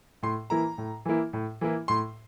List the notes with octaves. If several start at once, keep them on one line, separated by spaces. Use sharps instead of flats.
A2 C6
E3 A#3 E4 A#5
A2
E3 A#3 E4
A2
E3 A#3 E4
A2 C6